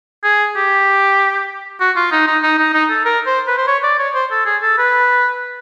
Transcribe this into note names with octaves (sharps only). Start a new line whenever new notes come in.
G#4
G4
F#4
F4
D#4
D#4
D#4
D#4
D#4
A4
A#4
C5
B4
C5
C#5
D5
C#5
C5
A4
G#4
A4
B4